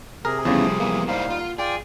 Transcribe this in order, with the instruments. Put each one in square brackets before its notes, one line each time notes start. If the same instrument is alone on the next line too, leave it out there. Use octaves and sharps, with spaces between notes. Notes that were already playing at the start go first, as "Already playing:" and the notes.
[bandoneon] C3 G#4 [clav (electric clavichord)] A#4
[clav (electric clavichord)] E2 C#3 [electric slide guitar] F3 A3 [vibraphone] G3
[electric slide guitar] E3 F3 B3 [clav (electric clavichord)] A#3
[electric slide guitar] G#2 E4 C5 [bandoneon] G3 D#4 F5 [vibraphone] F#5
[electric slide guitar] F4
[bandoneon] F4 D5 G5 [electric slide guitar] G#4 [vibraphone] G#5